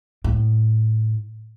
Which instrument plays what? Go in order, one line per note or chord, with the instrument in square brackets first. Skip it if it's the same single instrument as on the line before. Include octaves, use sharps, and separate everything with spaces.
[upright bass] A2